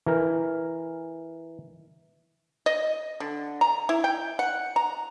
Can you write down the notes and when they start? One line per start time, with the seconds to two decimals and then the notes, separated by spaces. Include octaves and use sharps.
0.06 E3 A#4
2.66 D#5
3.20 D3
3.61 A#5
3.89 E4
4.04 G5
4.39 F#5
4.76 A#5